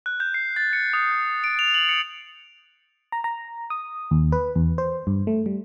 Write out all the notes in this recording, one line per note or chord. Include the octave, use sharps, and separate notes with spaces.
F#6
G6
C7
A6
C#7
D#6
G6
D7
F7
F#7
C#7
A#5
A#5
D#6
D#2
B4
E2
C5
G2
A3
G3